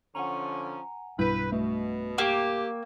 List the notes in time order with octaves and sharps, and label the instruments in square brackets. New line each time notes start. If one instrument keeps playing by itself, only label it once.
[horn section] D3 F3 C#4 [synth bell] F#5 G#5 A#5
[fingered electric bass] B1 G2 [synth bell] E4 E6 G6 [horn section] B4
[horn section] B2 [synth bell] A3
[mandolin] A#3 [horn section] G4 [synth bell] G5 C#6 E6